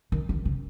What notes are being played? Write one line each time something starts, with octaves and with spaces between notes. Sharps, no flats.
D#3
D#3
C#3